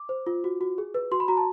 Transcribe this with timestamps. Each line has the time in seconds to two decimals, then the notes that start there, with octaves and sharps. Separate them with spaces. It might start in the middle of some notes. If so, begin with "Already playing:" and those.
Already playing: D6
0.09 C5
0.27 F4
0.44 F#4
0.61 F#4
0.78 G#4
0.94 B4
1.12 F#4 C6
1.20 B5
1.28 F#4 A#5
1.37 A5